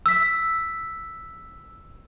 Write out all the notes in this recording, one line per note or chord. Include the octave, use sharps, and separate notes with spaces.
E6 B6